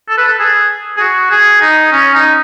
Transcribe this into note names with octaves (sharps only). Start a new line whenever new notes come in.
A4
B4
A4
G#4
G#4
F#4
G#4
D#4
C#4
D#4